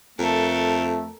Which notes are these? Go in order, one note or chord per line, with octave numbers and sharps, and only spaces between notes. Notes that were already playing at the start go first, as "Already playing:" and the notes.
F2 A3 A4 A#4